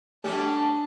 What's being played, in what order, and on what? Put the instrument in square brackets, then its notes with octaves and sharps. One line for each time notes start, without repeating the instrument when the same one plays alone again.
[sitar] B2 G3 C#4 [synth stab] A3 G4 [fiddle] D4 A5